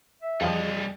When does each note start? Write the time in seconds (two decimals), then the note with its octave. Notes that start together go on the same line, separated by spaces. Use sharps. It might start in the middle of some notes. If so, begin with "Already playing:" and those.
0.22 E5
0.41 F2 F3 G3 G#4 D#5